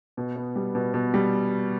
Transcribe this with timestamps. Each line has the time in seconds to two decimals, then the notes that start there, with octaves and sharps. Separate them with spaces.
0.17 B2
0.36 B3
0.56 G3
0.75 B2
0.94 B2
1.14 G3